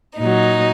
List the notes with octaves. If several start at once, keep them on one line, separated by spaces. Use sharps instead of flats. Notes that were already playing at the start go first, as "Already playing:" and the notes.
A#2 F#3 D#4